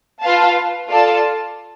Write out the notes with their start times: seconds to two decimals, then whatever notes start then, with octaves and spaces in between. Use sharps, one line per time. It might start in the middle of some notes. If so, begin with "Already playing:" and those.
0.22 F4 B4 F5 A5
0.88 F4 A4 D5 A5